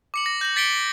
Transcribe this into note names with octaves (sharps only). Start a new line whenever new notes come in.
D6 C#7 F#7
A#6
G6 A#6 F#7
A6 B6 C#7 D7 G7